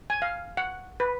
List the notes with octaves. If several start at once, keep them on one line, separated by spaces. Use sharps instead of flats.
G#5
F5
F#5
B4